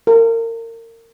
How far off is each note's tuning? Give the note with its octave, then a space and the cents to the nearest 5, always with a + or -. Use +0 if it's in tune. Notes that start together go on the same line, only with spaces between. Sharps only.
A#4 -30